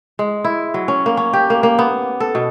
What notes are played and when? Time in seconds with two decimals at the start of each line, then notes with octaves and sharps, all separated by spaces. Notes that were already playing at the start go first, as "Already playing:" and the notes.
0.19 G#3
0.45 E4
0.74 F#3
0.88 C#4
1.06 A#3
1.17 C#4
1.33 G4
1.50 A#3
1.63 A#3
1.79 B3
2.20 A4
2.35 B2